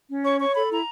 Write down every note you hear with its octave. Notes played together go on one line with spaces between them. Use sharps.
C#4
C#5 C#6
C#5 C#6
A4 B5
E4 A#5